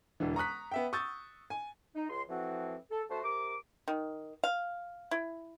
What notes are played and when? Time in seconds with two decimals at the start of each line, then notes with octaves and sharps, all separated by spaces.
0.20 E1 D3 E3
0.36 A#5 C#6 D#6 F#6 B6
0.72 B3 E5 G5
0.93 C#6 D#6 E6 G6 A6
1.50 G#5
1.96 D#4
2.09 C#2 C6
2.29 A2 E3 F3 C4 F#4
2.91 A4
3.10 D3 A3 F#4 C5 A5
3.23 C3 A#4 D6
3.88 D#3
4.44 F5
5.11 E4